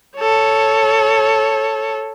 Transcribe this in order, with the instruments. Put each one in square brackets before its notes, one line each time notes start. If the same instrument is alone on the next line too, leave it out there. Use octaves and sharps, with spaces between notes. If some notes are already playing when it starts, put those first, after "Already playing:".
[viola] A4 C#5